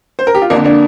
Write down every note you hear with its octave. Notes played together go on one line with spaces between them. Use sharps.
C5
A#4
G4
F4
F2 D3 A#3 D4
A#3 D4